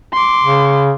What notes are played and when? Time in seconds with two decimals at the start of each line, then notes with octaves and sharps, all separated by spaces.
0.14 C6 D6
0.44 C#3